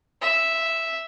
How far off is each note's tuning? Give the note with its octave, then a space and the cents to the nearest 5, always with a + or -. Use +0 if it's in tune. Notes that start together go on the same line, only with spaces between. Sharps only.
E5 +0